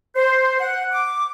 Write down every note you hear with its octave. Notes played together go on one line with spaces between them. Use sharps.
C5
F#5
D6